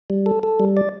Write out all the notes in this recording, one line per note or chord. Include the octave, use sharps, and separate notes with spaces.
G3
A4
A4
G3
D5